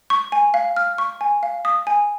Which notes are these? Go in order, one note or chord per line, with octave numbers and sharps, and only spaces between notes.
C#6
G#5
F5
F6
C#6
G#5
F5
D#6
G#5